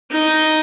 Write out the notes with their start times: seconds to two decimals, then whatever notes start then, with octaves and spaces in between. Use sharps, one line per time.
0.11 D#4